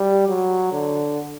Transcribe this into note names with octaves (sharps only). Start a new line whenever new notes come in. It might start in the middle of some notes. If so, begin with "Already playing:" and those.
Already playing: G3
F#3
D3